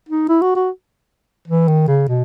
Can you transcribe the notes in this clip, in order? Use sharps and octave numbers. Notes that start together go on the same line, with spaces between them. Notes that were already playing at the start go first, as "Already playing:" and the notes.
D#4
E4
F#4
F#4
E3
D#3
C#3
B2